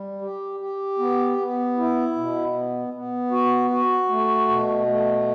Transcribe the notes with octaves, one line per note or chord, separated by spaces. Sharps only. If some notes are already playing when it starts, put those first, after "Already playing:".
Already playing: G3
G4
G4
B3
B3
E4
B2
B3
B3
F#4
F#4
A3
B2
A3